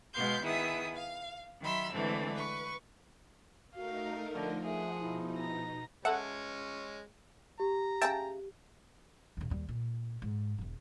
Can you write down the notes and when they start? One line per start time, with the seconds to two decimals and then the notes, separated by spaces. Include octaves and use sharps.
0.14 B2 G#3 B3 F5 C6 G6
0.43 D#3 B3 E4 G#4 E5 D#6
0.96 F5
1.61 D#3 F#3 E5 B5 C6 E6
1.93 D3 E3 G#3 A3 C4
2.34 B4 C#6
3.75 A3 D#4 F#4 A#4 F5
4.35 D3 F3 A5
4.64 G#4 E5 F#5
5.00 B2 D#4 E4
5.38 A#5
6.05 G#3 C#4 A4 E5 F#5
7.60 G4 A#5
8.02 C#3 G#4 E5 G5 A5
9.37 A#1 D#2
9.50 D#2 G3
9.69 A#2
10.22 G#2
10.58 E1 E2